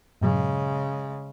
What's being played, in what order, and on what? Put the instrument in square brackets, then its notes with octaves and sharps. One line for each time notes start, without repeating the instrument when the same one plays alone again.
[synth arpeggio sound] G2 A#2 F#3 [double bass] C#3 G#3